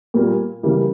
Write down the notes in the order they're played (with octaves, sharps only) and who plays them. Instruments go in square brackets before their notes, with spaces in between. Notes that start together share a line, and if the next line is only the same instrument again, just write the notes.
[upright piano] A#2 G3 A#3
C#3 E3 G3 A#3